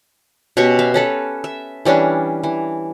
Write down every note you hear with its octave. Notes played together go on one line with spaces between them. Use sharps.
B2 C#4 G4 C#6
E5 F5
C#4 A4 B4
E5
E3 G3 C#4 D4
E3